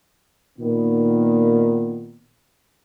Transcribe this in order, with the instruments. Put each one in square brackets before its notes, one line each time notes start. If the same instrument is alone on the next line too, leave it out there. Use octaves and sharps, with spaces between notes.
[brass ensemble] A#2 D#3 B3